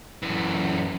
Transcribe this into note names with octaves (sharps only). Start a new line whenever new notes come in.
F#2 E3